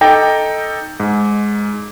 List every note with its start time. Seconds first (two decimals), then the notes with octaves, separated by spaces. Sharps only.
0.01 D#4 A4 G5 D6 A#6
1.00 G#2